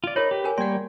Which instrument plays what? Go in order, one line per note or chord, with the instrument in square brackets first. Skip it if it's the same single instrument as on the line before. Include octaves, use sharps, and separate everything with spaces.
[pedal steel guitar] F4 D5
[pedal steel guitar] D#4 B5 [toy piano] G#4 A#4 C#5
[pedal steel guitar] G4 B4
[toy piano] G#4 A#4 G#5
[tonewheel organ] G3 [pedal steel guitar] A#3 C#5 [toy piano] F#5 C6